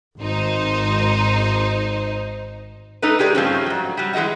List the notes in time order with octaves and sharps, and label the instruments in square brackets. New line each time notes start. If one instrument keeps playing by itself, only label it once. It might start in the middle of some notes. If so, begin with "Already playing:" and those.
[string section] G#1 D#4 C5
[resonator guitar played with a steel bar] A3 D#4 A4 B4
G#3 G4 G#4 D5
G2 F3 A3 C4 C#4
G#2 F#3
F#3 G3
E3 G#3 F4 D#5 F#5